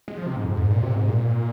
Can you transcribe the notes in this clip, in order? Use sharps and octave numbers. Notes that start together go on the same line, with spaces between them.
G#3
F3
C3
G#2
F2
G#2
A#2
C3
G#2
A#2